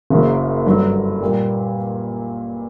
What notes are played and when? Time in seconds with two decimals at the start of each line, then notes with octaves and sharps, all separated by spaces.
0.10 F#1 F#2 C#3 F#3 A#3
0.66 G2 D3 F#3
1.21 A#2 G3 A#3